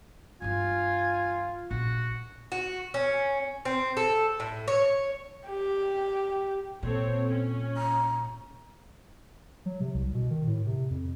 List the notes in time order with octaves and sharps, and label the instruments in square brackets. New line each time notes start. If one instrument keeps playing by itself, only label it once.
[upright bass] G2 E3 [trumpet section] F4 [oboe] G#5
[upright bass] A#1 [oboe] F#4
[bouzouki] F#4
C#4
C4
A4
A2
C#5
[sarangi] G4
[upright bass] A#2 [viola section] C4 A4 C#5
[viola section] C#4
[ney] A#5
[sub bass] F#3
C3
C2
B2
D#3
A2
C3
F2